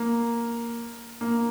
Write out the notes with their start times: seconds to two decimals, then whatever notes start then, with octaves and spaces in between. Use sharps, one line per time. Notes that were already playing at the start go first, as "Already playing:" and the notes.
Already playing: A#3
1.21 A#3